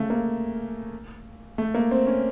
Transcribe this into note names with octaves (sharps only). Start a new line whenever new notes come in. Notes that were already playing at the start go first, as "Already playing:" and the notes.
Already playing: C#3 A3
A#3
A3
A#3
C4
C#4